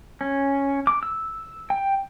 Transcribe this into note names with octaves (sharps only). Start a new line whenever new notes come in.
C#4
D6
E6
G5